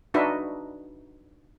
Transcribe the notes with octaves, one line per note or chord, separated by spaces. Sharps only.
D4 D#4 F#4 B4 D#5 E5